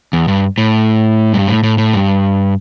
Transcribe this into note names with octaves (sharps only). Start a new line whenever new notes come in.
E2
G2
A2
G2
A2
A2
A2
G2